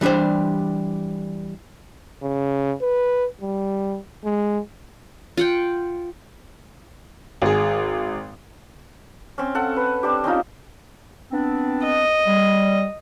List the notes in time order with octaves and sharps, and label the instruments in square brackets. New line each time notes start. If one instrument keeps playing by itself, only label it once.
[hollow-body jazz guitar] E3 G3 D4 G4 C5
[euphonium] C#3
B4
G3
G#3
[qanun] F4 F#5 G5
[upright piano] G#1 G#4
[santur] C4 C#4
A4 F#5
B4
C4 D4 G4
C4 C#4 D#4 F4
[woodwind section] B3 C4 D4
[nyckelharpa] D#5
[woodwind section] G3